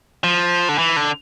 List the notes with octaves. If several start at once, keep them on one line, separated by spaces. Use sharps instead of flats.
F3
D3
E3
D3